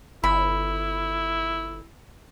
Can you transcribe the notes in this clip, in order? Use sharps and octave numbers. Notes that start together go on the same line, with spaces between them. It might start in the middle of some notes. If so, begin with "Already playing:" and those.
G1 E4 B5